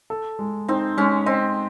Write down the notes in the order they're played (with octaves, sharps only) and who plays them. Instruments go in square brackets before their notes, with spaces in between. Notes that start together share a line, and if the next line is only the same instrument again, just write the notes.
[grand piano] A4
G#3
[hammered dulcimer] C4 [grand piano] D#4
[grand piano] G#3 [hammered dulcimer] C#4
[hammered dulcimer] C4 [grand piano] D#5